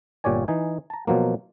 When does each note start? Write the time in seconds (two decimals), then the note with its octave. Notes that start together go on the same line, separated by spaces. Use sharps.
0.24 G1 A#2 G4 C#5 D5 G#5
0.48 E3 D#4 G#5
0.90 A5 A#5
1.07 B2 F3 F#3 A#3